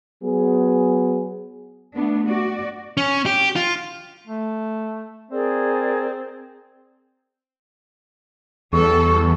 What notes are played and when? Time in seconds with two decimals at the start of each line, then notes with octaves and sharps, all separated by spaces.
0.24 F#3 B3 G#4
1.96 A3 B3 D4
2.28 F#4 D5
2.97 C#4
3.26 G4
3.56 F4
4.27 A3
5.31 C4 G#4 A#4 D5
8.73 E2 G3 A4 C#6